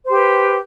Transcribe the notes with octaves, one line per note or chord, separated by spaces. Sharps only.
G4 B4 C5